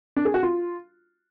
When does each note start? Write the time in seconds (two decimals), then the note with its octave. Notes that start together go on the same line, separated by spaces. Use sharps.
0.16 D4
0.25 G#4
0.34 F#4
0.43 F4